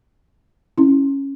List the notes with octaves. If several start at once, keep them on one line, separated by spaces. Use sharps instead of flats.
C#4 E4